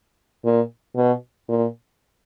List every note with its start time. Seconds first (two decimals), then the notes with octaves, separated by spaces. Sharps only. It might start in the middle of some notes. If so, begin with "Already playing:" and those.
0.44 A#2
0.96 B2
1.49 A#2